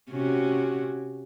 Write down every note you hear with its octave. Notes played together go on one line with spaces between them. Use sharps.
C3 C#4 F#4